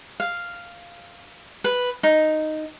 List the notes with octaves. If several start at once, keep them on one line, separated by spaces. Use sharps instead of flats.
F5
B4
D#4